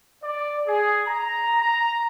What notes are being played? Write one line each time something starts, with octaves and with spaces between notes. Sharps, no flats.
D5
G#4
A#5
A#5